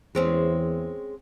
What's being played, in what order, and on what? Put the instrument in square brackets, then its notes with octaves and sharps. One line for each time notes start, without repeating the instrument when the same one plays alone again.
[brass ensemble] E2 [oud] G#3 C4 C#4